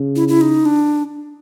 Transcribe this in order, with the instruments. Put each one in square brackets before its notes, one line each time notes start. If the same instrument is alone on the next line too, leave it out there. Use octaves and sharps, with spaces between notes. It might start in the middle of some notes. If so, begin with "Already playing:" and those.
Already playing: [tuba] C#3
[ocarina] E4
E4
D#4
D4